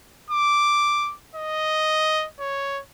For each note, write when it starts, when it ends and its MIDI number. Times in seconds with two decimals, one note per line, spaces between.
0.30 1.15 86
1.35 2.27 75
2.40 2.81 73